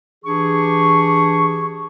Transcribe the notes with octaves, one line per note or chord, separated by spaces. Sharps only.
E3 D4 G4 G#4 C#6